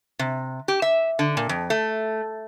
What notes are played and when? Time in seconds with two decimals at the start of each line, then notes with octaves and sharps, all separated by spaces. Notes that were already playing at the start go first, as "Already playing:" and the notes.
0.19 C3
0.68 G4
0.82 E5
1.19 D3
1.37 A#2
1.49 F2
1.70 A3